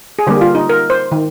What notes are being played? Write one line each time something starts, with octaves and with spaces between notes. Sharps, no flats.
G#4
D3 G3 A#3 G4
F4
D#4
A#4
C5
D#3